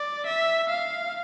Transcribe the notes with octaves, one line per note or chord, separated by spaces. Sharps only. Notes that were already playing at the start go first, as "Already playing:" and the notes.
Already playing: D5
E5
F5